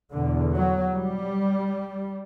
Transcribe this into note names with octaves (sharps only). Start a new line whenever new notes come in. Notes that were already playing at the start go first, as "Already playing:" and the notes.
E2 B2 D3
F#3
G3